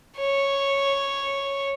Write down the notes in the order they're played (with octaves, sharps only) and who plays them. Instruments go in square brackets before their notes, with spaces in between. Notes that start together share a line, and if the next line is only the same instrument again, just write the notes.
[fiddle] C#5